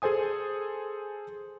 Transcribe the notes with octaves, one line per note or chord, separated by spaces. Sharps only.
G#4 A4 C5 G#5 D#6